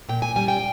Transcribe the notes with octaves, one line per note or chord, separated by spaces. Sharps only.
A#2 G5
G#5
G3 C#4 G#5
G5